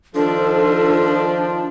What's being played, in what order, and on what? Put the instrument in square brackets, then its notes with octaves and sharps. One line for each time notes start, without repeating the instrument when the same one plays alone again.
[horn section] D#3 F3 [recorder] D4 [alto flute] A4